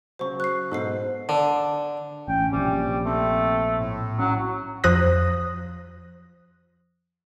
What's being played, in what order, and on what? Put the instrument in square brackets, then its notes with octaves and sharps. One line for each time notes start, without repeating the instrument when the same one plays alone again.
[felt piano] C#3 F#3 [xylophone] C5 C#6
[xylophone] F#6 C7
[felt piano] G#2 B2 [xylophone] A4 C5 C7
[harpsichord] D3
[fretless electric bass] A1 [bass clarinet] C#4 [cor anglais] G5
[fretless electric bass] A#1 C3 [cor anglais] G3
[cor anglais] A3 [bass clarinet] C4
[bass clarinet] A2
[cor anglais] F#3 [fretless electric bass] C#4
[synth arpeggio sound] F2 F3 C5 D#6 F#6 A#6